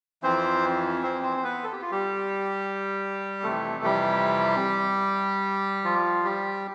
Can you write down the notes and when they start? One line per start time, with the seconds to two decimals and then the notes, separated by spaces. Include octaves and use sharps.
0.23 F2 E3 C4 C5
1.03 C4 C5
1.23 C4 C5
1.37 C5
1.43 B3 B4
1.63 A4
1.72 G4
1.82 F4
1.92 G3 G4
3.43 F2 C3 E3 A3 A4
3.84 G3 G4
5.84 F3 F4
6.25 G3 G4